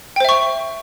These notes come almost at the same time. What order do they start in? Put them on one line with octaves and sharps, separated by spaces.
G5 C5 E5 C#6